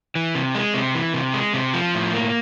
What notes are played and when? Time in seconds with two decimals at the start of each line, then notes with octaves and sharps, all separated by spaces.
0.15 E3
0.35 C3
0.55 G#3
0.74 C3
0.95 E3
1.14 C3
1.34 G#3
1.54 C3
1.73 F3
1.94 A2
2.13 A#3